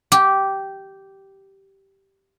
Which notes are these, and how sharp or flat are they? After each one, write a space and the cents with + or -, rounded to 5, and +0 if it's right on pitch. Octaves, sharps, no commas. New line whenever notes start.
G4 -10